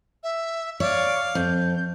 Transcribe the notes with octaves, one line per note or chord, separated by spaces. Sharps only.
E5
C#5 D5 F5
F2 G6